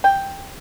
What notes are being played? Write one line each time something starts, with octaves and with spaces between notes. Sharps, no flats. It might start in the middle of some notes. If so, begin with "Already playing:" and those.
G5